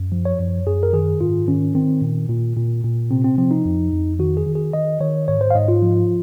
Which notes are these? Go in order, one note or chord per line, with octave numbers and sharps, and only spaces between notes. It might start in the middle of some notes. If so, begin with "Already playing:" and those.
Already playing: F#2
F3
C#5
F#2
F#2 G#4
A#4
D#3 G#4
G#2 F4
D#3 C#4
D#3 C4
A#2
A#2
A#2
A#2
C3 C4
C4
F3 C4
D#4
F2
F2
D#3 F#4
G#4
D#3
G#4
D#3 D#5
D#3 C#5
G#2 C#5
C5
F5
G#2 D#5
F4
F3